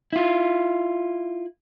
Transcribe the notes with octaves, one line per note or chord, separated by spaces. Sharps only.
E4 F4